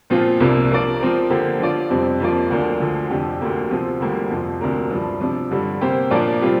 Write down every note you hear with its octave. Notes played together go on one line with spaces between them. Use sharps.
A#2 F3 C4 F4
C2 C3 A#3 D4
F3 D4 A#4 D5
F3 C4 A#4
D3 A#3 G4 C5
F3 D4 F4 D5
F2 C3 G3 C4
F2 F3 A#3 F4 D5
D2 D3 A#3 D4
D2 D3 F3
F2 C3 F3 D4 G4
D2 D3 A#3 G4
C3 F3 C4 F4
D2 D3 G3 A#3 G4
F2 C3 F3
D2 C3 A#3 D4 A#4
G2 F3 D4
C3 F3 D4
G2 D3 G3 D4
C3 A#3 G4 C5
A#2 F3 D4 A#4 D5
C3 G3 C4 F4